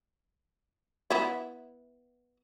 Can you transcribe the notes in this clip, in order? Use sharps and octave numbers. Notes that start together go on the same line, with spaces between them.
B3 E4